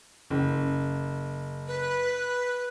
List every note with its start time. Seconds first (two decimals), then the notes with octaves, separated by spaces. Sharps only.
0.30 F#1
1.68 B4